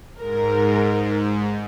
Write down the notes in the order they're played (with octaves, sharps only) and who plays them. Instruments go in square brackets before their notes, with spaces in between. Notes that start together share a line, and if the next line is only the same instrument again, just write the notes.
[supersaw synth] G#2 [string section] A#4